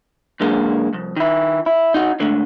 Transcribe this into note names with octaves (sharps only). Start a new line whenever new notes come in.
F#2 D3 G#3 A#3
C2 F2
D#3 E4
E4
D#4 F#4
G#2 D3 A3